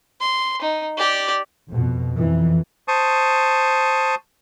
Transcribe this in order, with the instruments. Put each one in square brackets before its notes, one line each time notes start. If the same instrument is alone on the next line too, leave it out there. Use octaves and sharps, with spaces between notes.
[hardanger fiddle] C6
D#4
G4 D5
[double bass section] F2 B2
F2 E3
[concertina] C5 A5 C#6 D#6